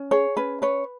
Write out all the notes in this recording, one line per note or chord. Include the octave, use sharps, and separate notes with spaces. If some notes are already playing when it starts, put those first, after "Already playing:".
Already playing: C#4
G#4 C#5
C#4 B4
B4 C#5